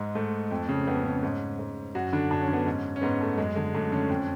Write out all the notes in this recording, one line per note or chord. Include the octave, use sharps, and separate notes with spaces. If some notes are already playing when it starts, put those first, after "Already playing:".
Already playing: G#2 G#3
G#2 A3
F2
C#3
F2 B3
C#3 C#4
G#2
G#2
F#2 F#4
D3 D4
F#2 D4
C#4
D3
B3
G#2 C#4
C#4
G#2 B3
A3
F#2 G#3
D3 G#3
F#2 A3
D3 C#4
F2